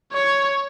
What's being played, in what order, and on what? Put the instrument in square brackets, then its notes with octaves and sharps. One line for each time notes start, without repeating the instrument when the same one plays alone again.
[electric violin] C#5